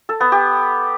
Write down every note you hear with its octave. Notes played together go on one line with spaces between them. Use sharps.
A4
B3
G4